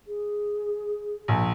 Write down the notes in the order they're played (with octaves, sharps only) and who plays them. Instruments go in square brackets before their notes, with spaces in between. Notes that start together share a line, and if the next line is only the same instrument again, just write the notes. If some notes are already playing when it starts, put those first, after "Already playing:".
[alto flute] G#4
[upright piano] A#1